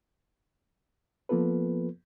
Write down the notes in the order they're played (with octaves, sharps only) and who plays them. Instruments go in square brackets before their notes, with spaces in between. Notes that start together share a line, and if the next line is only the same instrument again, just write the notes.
[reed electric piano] F3 A#3 B3 F4 A4 B4